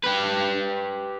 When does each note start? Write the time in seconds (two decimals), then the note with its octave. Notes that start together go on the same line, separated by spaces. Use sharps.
0.03 G4 B4